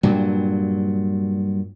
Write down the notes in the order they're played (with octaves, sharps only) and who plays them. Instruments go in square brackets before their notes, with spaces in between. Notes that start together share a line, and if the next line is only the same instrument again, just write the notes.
[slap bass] G2 A#2 F#3